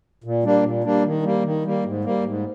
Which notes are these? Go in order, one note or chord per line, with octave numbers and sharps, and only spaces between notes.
A#2
G3 A#3 D4
A#2
G3 A#3 D4
D#3
G3 A#3
D#3
G3 A#3
G#2
G3 A#3
G#2